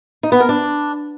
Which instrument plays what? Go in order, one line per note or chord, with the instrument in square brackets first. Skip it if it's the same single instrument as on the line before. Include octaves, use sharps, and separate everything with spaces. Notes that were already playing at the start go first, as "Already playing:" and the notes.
[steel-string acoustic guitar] D#4
B3
A#4
D4